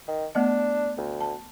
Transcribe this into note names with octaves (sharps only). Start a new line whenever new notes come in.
D#3
A3 B3 D4 D#5
D2
A5